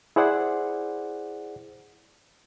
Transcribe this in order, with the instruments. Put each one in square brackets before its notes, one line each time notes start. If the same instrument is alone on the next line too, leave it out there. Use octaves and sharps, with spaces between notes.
[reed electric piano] E4 G#4 C5 D5 F#5